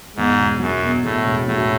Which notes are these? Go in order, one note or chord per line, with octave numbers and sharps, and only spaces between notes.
E2 G#2
E1
F#2 F#3
B2
E2 A2
E1
A2 F#3